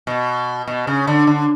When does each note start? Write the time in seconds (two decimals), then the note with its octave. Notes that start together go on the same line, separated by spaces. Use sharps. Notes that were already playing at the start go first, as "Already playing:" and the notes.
0.07 B2
0.67 B2
0.87 C#3
1.07 D3
1.27 D3